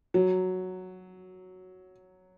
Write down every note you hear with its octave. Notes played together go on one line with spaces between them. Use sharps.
F#3